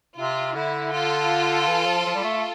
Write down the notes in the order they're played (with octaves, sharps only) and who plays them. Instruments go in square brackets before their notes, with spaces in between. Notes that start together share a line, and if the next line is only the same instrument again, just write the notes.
[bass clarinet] C3 [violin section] F4
[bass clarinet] D3 [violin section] E4
[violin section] F4 A4
[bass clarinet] E3
F3
F3
G3
A3